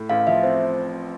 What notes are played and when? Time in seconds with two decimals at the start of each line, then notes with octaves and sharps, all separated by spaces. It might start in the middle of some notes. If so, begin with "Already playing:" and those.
Already playing: A2
0.09 A1 F5
0.27 F3 E5
0.43 C4 C5